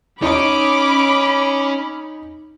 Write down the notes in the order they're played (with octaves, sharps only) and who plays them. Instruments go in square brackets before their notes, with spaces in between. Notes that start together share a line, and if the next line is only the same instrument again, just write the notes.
[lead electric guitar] C#4 C#5 [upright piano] D#4 D#5 [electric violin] B5 [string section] D6